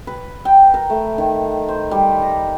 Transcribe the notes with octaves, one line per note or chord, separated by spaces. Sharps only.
B4
G5
A#4
A3
D#3
C5
G3
A#5